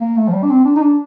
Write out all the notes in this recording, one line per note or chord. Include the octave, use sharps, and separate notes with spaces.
A#3
A3
F3
G3
D4
C4
D4
D#4
D4